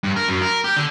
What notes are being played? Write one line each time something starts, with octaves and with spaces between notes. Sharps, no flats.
G2
A#4
F#2
A#4
G4
D3